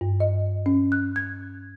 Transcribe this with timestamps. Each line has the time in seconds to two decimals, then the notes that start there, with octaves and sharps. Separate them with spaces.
0.01 G2
0.20 D#5
0.66 C#4
0.92 F#6
1.16 G#6